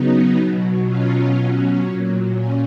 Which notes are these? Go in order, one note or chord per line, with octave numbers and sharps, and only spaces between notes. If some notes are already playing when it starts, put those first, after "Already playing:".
Already playing: C#3 F#3 B3 D#4
B2 F#3
B2 F#3 C#4 F4
B2 F#3 C#4
A#2 F#3
A#2 C#4